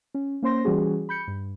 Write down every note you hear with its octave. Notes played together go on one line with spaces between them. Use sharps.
C#4
A#3 C#4 C5 C6 A#6
E3 G3 C#4 F#4 G#4
B5 G6 C#7
G2